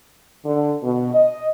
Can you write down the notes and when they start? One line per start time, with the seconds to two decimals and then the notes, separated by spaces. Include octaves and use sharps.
0.45 D3
0.83 B2
1.14 D#5